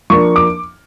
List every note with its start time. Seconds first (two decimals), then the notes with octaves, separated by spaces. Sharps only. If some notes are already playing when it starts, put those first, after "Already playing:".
0.10 F3 A#3 D4 C#6
0.36 D6